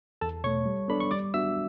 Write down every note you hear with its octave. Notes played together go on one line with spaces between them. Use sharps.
E2 A4 A5
B2 A3 C#5 C#6
G3
B3 D4 A4 D5 B5
C#6
G3 D5 D6
B3 D4 F#4 E5 E6